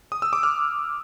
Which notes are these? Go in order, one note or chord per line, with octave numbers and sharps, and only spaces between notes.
D#6
E6
D6
F6